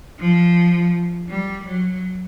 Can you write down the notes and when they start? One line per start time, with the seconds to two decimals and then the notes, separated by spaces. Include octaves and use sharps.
0.19 F3
1.29 G3
1.65 F#3